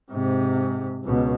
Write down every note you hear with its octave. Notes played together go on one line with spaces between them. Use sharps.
G#2 C3
C#2 B2